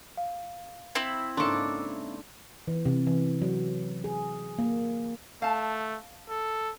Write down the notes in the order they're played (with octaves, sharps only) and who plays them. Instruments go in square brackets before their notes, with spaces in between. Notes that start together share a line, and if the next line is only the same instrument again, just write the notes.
[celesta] F5
[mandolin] C4 E4
[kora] G#2 C#3 A#3 [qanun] D4 A4 [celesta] C6 C#6
[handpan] E3
C3
E3
F#3
G#4
A#3
[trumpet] A3 [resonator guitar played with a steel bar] F5 A5
[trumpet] A4